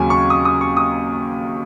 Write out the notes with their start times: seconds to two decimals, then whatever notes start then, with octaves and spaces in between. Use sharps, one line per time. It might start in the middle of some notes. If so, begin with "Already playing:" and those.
Already playing: D#2 C#3 F#3 C#4 G#5
0.10 C#6
0.30 D#6
0.45 D#6
0.61 C#6
0.77 D#6